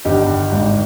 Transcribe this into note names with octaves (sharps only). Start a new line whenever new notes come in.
G1 G2 D#3 D#4 G4
G#1 G#2 D#3